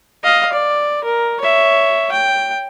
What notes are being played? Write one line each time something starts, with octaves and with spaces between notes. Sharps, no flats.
D#5 F5
D5
A#4
C#5 E5
G5